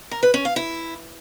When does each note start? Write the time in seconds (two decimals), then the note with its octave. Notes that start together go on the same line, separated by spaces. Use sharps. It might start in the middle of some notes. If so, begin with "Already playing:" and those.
0.11 A#4
0.23 B4
0.34 C#4
0.45 F5
0.56 E4